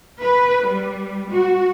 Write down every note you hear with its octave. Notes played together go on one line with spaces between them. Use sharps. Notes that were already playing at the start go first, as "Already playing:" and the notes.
B4
G3
F#4